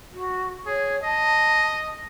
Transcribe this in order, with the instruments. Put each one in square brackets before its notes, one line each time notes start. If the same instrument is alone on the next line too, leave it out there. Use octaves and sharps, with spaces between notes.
[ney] F#4
[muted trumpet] G#4 [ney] C#5
[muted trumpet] D#5 [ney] A5